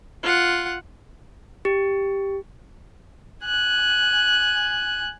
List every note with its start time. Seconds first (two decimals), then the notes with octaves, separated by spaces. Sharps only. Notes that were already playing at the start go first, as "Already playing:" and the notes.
0.23 F4 F#5
1.65 G4
3.45 G#5 F#6